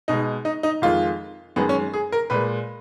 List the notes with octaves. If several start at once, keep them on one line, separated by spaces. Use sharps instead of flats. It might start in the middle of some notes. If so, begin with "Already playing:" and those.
B2 G#3 D#4
D#4
D#4
F2 D#3 G#3 F4
F#2 D#3 G#3 B3
C#4
G#4
A#4
A#2 G#3 B4